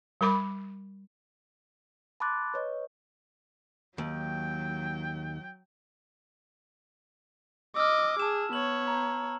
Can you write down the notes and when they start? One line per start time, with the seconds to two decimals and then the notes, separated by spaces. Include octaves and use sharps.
0.21 G3 A#4 B5 D6
2.20 A5 B5 C6 D6 F#6 A6
2.54 B4 C#5 D#5
3.98 D#2 F#3 G5
7.76 D#5 D6 E6 F6
8.20 G#4 A5 E7
8.53 B3 C#5 F#7
8.87 A#5